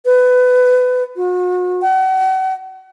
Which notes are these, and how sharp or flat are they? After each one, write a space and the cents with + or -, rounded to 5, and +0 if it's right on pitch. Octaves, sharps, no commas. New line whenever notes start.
B4 +20
F#4 -40
F#5 +35